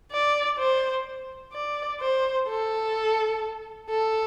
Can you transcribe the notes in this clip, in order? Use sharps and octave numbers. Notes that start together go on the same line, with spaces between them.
D5
C5
D5
C5
A4
A4